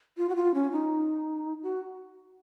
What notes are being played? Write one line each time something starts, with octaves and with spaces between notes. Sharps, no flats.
F4
F#4
F4
C#4
D#4
F#4